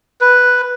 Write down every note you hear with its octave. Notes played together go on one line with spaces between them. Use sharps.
B4